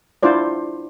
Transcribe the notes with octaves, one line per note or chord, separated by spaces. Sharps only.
D4 E4 F4 C5 D5